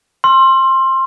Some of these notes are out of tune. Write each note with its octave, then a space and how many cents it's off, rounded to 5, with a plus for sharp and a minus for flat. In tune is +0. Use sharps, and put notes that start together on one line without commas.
C6 +15 E6 +45